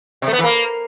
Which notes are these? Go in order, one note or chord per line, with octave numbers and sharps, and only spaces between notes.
C3
A3
B3
E3
A#3